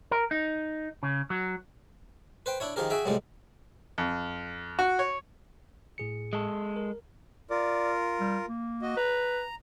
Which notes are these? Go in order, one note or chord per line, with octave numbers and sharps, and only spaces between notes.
A#4
D#4
C#3
F#3
B4 C5 G5
D4 E4 C#5
D#3 F3 G4 G#4 A#4
F#4 G#4 E5 G5
C2 A2 F3 G3 G#3
F2
F#4
C#5
A2 G#4 C#7
G#3 A4
A#4
F4 A#4 D5
G3
A#3
F#4 D#5
B4 A#5